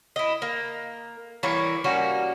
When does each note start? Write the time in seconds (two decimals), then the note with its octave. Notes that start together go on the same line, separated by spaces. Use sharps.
0.16 E4 D#5
0.42 A#3
1.43 E3 G3 A#3 C#5
1.84 G3 A#3 C#4 F#4